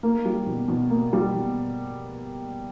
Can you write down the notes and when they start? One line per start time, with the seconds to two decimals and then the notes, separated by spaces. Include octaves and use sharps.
0.03 A#3
0.25 G3
0.46 B2
0.68 B2
0.90 A#3
1.13 G3
1.34 B2